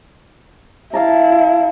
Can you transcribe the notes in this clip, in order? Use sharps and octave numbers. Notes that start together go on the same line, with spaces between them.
E4 F5 A5 A#5